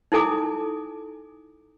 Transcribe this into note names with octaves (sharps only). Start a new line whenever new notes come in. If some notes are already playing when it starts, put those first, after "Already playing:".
D#4 E4 A4 G#5 D6